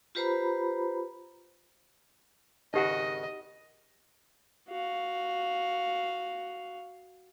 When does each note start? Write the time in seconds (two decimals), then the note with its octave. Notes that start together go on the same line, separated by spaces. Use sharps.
0.15 F4 G4 B4 C5 A#5 B5
2.74 G#1 C#3 D#4 F#4 G4 D#5 F#5
4.68 F#4 F5